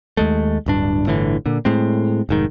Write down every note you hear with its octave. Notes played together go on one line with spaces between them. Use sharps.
D#2 G#3 A3
D1 G2 D4
G1 A2 D3 E3
A#2 D3
A2 G#3 C4
F1 G#2 D#3